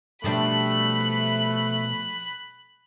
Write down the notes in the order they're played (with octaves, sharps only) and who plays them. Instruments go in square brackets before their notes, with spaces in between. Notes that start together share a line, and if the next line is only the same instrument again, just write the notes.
[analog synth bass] B2 [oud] F3 G3 D4 [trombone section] A3 [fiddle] B5 F#6